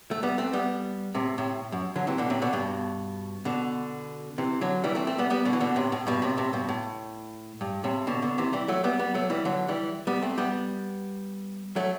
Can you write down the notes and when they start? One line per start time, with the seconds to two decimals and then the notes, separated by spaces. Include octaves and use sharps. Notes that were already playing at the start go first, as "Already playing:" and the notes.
0.11 A3
0.23 G3 B3
0.38 A3 C4
0.53 G3 B3
1.15 A2 C3
1.38 A2 C3
1.72 F#2
1.96 D3 F#3
2.07 C3 E3
2.18 B2 D3
2.30 A2 C3
2.42 B2 D3
2.53 G2 B2
3.45 B2 D3
4.38 C3 E3
4.61 D3 F#3
4.84 E3 G3
4.95 A3 C4
5.07 A3 C4
5.18 G3 B3
5.30 G3 B3
5.45 B2 D3
5.53 E3
5.60 B2 D3
5.76 A2 C3
5.92 A2
6.07 G2 B2
6.22 A2 C3
6.37 A2 C3
6.53 G2 B2
6.69 A2
7.61 G2
7.84 A2 C3
8.07 B2 D3
8.22 B2 D3
8.38 C3 E3
8.53 E3 G3
8.68 F#3 A3
8.84 G3 B3
8.99 G3 B3
9.14 F#3 A3
9.30 E3 G3
9.45 D3 F#3
9.68 E3 G3
10.07 G3 B3
10.22 A3 C4
10.38 G3 B3
11.76 F#3 A3